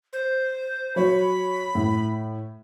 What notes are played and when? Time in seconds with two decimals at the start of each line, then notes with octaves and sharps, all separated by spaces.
0.13 C5
0.96 F#3 C#5 B5
1.75 A2